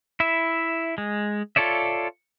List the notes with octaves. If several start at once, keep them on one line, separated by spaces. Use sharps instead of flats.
E4 E5
G#3
F4 A4 C#5 D5 E5